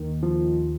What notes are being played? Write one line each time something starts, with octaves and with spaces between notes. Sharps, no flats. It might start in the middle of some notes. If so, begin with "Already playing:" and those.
Already playing: D#2 D#3
F3